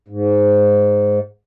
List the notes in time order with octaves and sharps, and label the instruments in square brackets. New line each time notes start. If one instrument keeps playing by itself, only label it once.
[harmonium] G#2